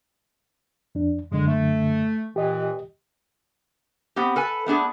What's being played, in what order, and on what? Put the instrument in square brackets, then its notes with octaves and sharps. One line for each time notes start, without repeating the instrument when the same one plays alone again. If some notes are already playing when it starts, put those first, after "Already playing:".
[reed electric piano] F2 D4
[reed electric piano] F#2 D3 [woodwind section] G#3
[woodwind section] A3
[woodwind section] A#2 E3 [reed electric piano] G4 D#5
[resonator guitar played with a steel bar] B3 C4 G4
A4 B4 G#5
A3 B3 D4 G#4